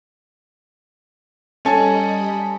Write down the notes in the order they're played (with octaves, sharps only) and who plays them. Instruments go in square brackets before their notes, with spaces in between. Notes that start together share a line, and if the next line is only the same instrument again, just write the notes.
[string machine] G3 D#5 B5 [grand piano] C#4 A4 G#5